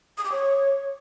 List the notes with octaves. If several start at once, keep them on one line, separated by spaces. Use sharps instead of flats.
D#6
D6
C#5